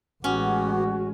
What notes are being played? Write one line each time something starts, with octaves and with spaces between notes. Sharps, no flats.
A1 G#3 B3 C#4 F#4 G4